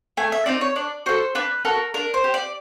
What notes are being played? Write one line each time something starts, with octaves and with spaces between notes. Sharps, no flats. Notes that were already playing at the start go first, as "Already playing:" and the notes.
A3 G#5
E5
C4 D#4 D5
C#5
D4 D5
F#4 A4 C5
D4 B4
F#4 A4 A#4
D4 A#4
C5
G4
D5